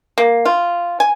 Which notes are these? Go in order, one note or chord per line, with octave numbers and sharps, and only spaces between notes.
A#3
F4
G#5